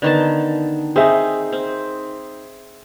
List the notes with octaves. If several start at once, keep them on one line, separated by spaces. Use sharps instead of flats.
D3 D#3 B3 A5
C4 D#4 G#4 E5
C4